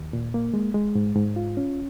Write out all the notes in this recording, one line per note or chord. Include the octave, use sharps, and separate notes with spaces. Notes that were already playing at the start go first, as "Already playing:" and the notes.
Already playing: D#2
A#2
A#3
G#3
G#3
G#2
G#2
F4
C#4